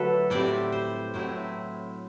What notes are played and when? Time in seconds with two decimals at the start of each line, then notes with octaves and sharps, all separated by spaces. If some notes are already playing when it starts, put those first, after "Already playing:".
Already playing: D3 F#3 A3 A4 B4
0.30 A2 G3 C4 E4 D5
0.72 C5
1.14 A2 F#3 C4 E4